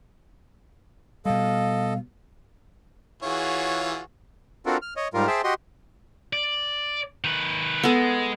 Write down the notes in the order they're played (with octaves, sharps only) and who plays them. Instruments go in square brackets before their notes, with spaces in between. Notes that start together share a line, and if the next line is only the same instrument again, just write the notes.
[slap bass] B2 G3 [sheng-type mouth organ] A4 D#5 [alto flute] F5
[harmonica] E3 F4 C#5 [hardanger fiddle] F#4 G#4
[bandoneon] C4 D4 F4 F#4 A4 A#4
F6
C#5 D#5
G#2 G3 F4 A#4
G#4 C5 E5 G5 A5
F#4 G4 D#5 C6
[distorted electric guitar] D5
D#3 B4
[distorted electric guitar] G#3 [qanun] B3 A4